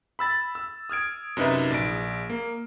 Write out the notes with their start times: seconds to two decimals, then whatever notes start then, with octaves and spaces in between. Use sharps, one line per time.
0.19 B5 E6 A6
0.55 E6
0.90 D#6 F6 G#6 D7
1.37 F#2 C3 D#4 B4 E5
1.70 A#1 D7
2.30 A#3